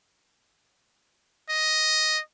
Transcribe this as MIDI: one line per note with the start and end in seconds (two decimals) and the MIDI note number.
1.49 2.20 75